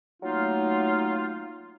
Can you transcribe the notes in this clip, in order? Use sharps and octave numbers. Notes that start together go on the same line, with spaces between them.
F#3 A3 A#3 D#4 F4